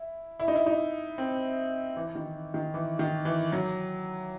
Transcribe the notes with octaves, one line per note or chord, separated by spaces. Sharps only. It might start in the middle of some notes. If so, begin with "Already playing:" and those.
Already playing: E4
E4
D#4
E4
D#4
C4
E3
D#3
D#3
E3
D#3
E3
F#3